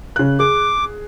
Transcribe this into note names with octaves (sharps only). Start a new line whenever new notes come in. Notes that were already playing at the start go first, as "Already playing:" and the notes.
C#3 F#6
G#4 D6